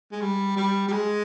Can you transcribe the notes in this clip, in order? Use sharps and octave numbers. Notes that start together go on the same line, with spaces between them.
G#3
G3
G3
G3
G#3